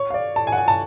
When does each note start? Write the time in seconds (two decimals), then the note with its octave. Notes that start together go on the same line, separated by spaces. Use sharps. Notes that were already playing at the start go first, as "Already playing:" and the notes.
Already playing: C#5
0.10 F5
0.14 D5
0.36 A5
0.47 G#5
0.52 F#5
0.58 G#5
0.68 A5